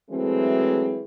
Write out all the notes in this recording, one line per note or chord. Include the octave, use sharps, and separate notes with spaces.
E3 F#3 G#3 A3 C4